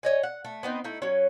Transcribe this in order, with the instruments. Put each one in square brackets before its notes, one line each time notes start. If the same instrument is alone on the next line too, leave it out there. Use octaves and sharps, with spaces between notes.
[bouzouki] C#5 D#5 G#5
F#5
A3
B3 C4 D#4
A3 D#4 E4
F#3 C#4